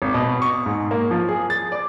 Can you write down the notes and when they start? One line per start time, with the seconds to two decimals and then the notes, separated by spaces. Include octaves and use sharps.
0.02 G#1
0.14 B2
0.42 C#6
0.66 G#2
0.91 A#3
1.11 F3
1.29 G#4
1.50 A6
1.72 D5